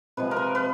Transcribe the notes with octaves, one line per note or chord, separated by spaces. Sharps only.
C3 F3 G#3 B4
A#4
B4
B4